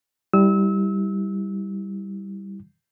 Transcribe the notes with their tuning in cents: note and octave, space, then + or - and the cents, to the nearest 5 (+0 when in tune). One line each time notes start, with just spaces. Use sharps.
G3 +0 E4 -20 E6 -30